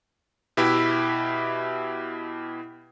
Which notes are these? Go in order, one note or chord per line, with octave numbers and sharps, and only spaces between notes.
B2 E4 G4 B4 E5 B6